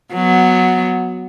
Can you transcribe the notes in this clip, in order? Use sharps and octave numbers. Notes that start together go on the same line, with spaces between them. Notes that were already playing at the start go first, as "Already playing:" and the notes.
F#3 B3